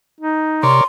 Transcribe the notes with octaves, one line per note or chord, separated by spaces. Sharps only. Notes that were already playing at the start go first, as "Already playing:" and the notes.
D#4
C3 A#4 C#5 D5 C6